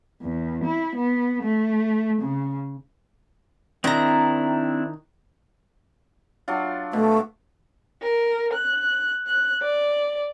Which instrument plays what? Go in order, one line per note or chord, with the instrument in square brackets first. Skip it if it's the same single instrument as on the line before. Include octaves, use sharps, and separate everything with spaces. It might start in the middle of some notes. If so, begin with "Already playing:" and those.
[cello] E2
E4
B3
A3
C#3
[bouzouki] D#3 A#5 [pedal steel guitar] C4 D4 E4
[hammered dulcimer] F#3 D4 F4
[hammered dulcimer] B2 [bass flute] A3
[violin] A#4
F#6
F#6
D5